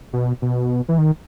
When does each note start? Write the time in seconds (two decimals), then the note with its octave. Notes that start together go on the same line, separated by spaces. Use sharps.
0.13 B2
0.42 B2
0.88 E3
0.98 D#3